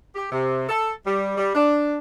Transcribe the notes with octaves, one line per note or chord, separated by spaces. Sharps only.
G4
C3
A4
G3
G3
D4